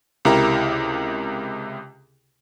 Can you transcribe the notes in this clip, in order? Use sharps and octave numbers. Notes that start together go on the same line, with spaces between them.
C#2 C3 E4 G4 A#4 A#5